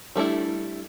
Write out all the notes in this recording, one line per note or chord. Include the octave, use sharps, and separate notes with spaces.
G3 A3 D4 E4